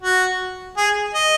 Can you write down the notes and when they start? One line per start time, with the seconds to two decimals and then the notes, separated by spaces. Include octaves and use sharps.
0.02 F#4
0.77 G#4
1.14 D#5